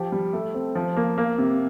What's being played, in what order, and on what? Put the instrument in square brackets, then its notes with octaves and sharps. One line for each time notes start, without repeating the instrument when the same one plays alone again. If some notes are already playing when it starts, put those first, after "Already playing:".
Already playing: [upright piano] F3 G4
G3
A3
C4
F3
A#3
A#3
C3